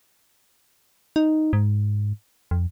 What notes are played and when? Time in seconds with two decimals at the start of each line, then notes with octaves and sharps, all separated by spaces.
1.16 D#4
1.53 G#2
2.51 F2